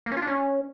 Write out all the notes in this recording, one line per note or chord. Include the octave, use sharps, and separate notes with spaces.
A#3
C#4
F4
D4
C#4